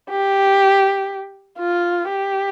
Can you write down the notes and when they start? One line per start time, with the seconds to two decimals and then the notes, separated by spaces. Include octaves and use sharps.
0.10 G4
1.59 F4
2.09 G4